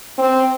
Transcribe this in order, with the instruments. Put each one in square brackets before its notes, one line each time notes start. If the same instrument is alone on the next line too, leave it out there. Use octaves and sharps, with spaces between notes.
[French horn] C4